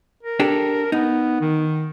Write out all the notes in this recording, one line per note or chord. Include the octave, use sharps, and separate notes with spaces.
A#4
D4 G4 A4
B3 D#4
D#3